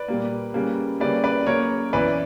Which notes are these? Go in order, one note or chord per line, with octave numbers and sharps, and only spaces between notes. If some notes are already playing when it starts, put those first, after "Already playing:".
Already playing: B4 D5
A#2 G3 A#3
C#3 G3 A#3
C#3 G3 A#3 B4 D5
B4 D5
C#3 F#3 A#3 A#4 C#5
F#2 E3 B3 B4 D5